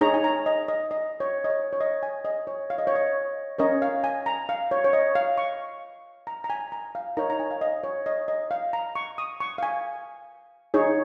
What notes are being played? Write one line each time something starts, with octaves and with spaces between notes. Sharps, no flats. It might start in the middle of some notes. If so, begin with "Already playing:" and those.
D#4 G#4 C#5 A#5
G#5
A#5
D#5
D#5
D#5
C#5
D#5
C#5
C#5
D#5
G#5
D#5
C#5
F5
D#5
C#5
D#5
C#4 A#4 C#5 D#5
F5
G#5
A#5
F5
C#5
C#5
D#5
F5
C#6
A#5
A#5
G#5
A#5
F5
D#4 A#4 C#5 A#5
A#5
G#5
F5
D#5
C#5
D#5
D#5
F5
A#5
C#6
D#6
C#6
F5
G#5
D#4 G#4 C#5